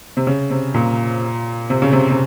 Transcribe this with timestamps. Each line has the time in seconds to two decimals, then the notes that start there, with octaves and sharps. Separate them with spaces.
0.17 C3
0.27 C#3
0.50 C3
0.74 A#2
1.70 C3
1.82 C#3
1.92 C3
2.10 C3